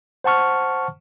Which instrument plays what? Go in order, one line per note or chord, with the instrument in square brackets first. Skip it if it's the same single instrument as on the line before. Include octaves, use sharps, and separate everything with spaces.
[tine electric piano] C5 F#5 A5 C#6 F6